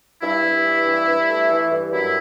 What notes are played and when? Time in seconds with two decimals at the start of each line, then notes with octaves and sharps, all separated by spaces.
0.22 G2 E4
0.43 G2
0.64 E3
0.86 G2
1.07 G2
1.28 A3
1.50 E3
1.71 G2
1.92 F#2 E4